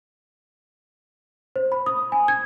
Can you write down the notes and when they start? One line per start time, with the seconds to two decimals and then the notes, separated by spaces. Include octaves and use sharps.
1.56 C5
1.72 B5
1.86 D#6
2.12 G#5
2.28 G#6